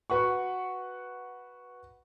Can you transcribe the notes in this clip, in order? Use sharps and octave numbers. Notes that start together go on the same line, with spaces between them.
F#4 B4 F#5 C#6